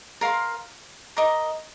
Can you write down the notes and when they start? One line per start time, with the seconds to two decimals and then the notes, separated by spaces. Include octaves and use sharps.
0.21 A#4 F5 C6
1.17 A#4 D#5 A#5 D6